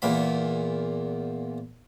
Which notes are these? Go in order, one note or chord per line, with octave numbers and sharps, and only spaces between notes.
E2 A#2 B5